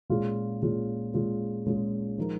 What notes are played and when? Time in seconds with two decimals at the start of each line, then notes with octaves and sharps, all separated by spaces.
0.09 A#2 G#3 C#4 F4 G#4
0.62 A#2 G#3 C#4 F4 G#4
1.14 A#2 G#3 C#4 F4 G#4
1.66 A#2 G#3 C#4 F4 G#4
2.18 F3 G#3 D#4 A#4